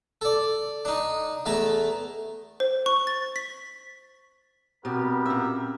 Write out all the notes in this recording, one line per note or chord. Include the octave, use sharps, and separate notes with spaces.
A4 D5
D4 D#4
E2 A3 A5 A#5
C5
C#6
A6
B6
B2 G3 B3 C4 G4 A#4
A#2 C#4 E5